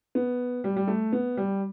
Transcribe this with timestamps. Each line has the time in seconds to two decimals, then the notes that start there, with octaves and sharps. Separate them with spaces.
0.15 B3
0.64 G3
0.76 G3
0.87 A3
1.13 B3
1.37 G3